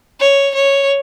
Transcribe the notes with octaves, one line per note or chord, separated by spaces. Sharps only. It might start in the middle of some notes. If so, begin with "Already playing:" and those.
C#5
C#5